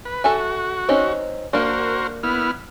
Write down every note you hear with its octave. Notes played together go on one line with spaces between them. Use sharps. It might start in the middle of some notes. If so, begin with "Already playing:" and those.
B4
F#4 A4 E5 G#5
C4 C#4 D#4
A#3 D4 F#4 A#4 C5
B3 E4 F6